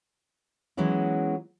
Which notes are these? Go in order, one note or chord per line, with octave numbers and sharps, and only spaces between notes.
E3 F#3 G#3 B3 C#4 E4